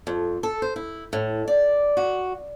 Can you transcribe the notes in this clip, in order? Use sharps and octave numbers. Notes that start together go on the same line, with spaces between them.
F2
A4
C5
E4
A2
D5
F#4